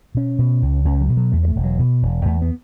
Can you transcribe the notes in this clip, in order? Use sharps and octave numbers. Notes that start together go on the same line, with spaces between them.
B2 C#4
B2
C#2
C#2 C#4
F#3
B2
F#3
E2 A3
F#3
A3
E1
F#3
B2
E1
E2 A3
B3